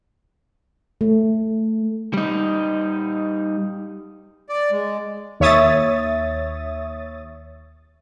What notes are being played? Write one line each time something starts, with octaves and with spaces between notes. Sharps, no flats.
A3
G3 D#4
D5
G#3
D#2 C#5 E5 D#6 A6